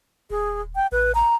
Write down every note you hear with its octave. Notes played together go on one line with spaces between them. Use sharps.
D#1 G#4
G5
A1 B4
A#5